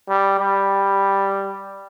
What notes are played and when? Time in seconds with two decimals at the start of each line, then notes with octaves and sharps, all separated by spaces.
0.09 G3
0.39 G3